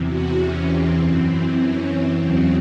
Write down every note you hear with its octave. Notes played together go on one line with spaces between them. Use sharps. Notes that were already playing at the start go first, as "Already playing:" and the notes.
Already playing: E2 C3 E3
F#4
C#4
C4
F#2 E3
C#4
C4
E2 C#3 F#3 C4